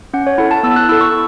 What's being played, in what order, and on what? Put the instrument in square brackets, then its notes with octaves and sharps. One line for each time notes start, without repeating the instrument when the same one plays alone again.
[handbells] C#4 F#5
C#5
E4 A4 F#5
A5
B3 E6
F#6
E4 A4 E6
C#6